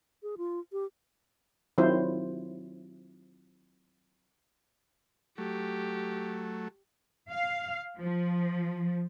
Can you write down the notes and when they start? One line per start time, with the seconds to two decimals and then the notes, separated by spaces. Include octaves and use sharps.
0.23 G#4
0.38 F4
0.72 G4
1.78 D#3 F#3 C4 E4 F4 C5
5.38 F#3 A3 G4
7.31 F5
7.98 F3